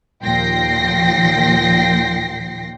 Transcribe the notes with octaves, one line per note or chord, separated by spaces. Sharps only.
D#2 A#2 F3 G5 A#6 C7